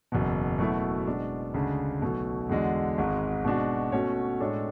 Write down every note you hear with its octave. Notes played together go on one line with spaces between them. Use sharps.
F#1 E2 B2
B2 F#3 A3 E4
B2 G#3 D4
D2 C#3 G#3 D4
B1 B2 A3
E2 D3 G#3 D4 F#4
G#1 G#2 G#3
B2 G#3 D4 F#4
B2 A3 C#4 F#4 C#5
A2 G#3 D4 A4 C#5